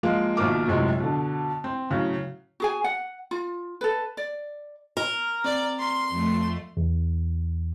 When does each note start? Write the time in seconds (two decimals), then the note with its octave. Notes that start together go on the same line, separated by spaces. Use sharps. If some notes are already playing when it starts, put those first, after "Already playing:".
0.03 F3 G#3 A#3
0.37 A#1 B2 D#3 A#3 A#4 D6
0.68 A#1 F#2 A2 C3 F#3 G#3
1.00 B2 D3
1.64 C4
1.90 A2 C#3 F#3
2.60 F#4 G#4 G#5
2.84 F#5
3.31 F4
3.81 A4 B4
4.17 D5
4.97 A#4
5.44 C4 D5
5.79 C6
6.09 F2 A3
6.77 E2